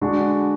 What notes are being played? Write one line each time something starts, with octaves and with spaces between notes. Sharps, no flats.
D3 G#3 D4 F#4